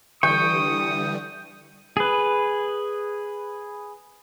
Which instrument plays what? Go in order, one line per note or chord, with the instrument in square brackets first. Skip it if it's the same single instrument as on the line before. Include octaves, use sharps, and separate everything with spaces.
[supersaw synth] D3 E3 G3 [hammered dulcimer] G5 [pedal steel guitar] C#6 [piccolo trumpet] D#6
[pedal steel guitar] G#4 B4